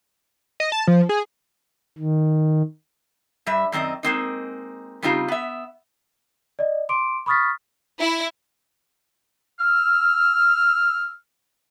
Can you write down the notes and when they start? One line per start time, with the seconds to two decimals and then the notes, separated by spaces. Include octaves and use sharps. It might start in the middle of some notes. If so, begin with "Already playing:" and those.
0.60 D#5
0.72 A5
0.87 F3
1.09 G#4
1.98 D#3
3.46 G2 G3 E5
3.72 F#2 D#3 C4 D5 D#5
4.03 G#3 A#3 C4 D#4
5.02 C#3 G3 C4 D#4 F4 G4
5.28 B3 E5
6.59 D5 D#5
6.89 C6 D6 D7
7.26 B5 C#6 D#6 F6 A6 B6
7.99 E4
9.60 E6 F6